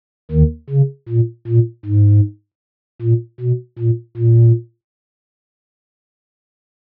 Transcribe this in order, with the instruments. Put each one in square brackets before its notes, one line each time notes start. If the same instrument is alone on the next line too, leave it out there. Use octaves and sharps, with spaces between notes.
[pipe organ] D#2 D#3
C#3
A#2
A#2
G#2
A#2
B2
A#2
A#2